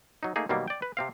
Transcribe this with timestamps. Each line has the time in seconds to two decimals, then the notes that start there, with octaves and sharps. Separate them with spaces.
0.23 F#3 D#4
0.36 A3 A#3 D#4 G#4
0.49 B2 D#3 F#3 G3 A#3
0.68 D5 G5
0.82 B4
0.97 C3 C4 F5